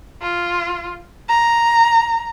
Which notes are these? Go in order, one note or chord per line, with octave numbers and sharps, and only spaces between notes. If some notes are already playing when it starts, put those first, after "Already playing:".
F4
A#5